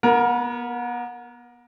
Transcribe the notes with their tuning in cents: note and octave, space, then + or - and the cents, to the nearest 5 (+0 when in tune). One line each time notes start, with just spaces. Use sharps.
B3 -30 A#4 +10